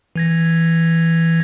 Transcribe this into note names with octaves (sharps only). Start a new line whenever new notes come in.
E3 G#6 A#6